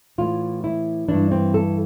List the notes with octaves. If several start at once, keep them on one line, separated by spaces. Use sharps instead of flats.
A2 E3 F4
E4
G2 E3 D4
C4
A4